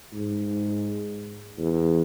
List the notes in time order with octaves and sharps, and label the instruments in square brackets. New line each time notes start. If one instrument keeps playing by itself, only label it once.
[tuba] G#2
E2